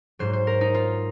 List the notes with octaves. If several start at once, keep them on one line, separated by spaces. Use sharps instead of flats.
G#2 F#3 C5
C5
A#4
D#4
F4